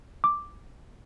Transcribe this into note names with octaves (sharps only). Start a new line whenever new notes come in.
D6